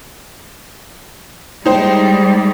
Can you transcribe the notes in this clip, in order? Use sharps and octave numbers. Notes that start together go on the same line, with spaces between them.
G3 G#3 D#4 C5 G5